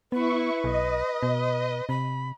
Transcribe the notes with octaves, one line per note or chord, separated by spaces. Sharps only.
B3 E4 B4 C#6
B1 D#5
B2
C3 B5